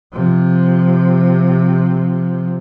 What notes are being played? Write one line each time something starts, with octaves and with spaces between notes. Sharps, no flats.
C3 F3